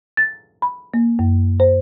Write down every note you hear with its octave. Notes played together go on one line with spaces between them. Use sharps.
A6
B5
A#3
F#2
C5